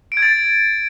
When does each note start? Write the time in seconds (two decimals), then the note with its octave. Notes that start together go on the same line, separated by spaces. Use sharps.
0.12 D7
0.17 G#6
0.22 A6